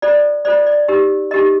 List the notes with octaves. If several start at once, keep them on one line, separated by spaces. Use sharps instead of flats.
F4 A4 C5 D5
F4 A4 C5 D5
D5
D#4 G4 A#4
D#4 G4 A#4 D#5